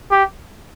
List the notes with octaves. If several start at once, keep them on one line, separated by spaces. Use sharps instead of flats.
G4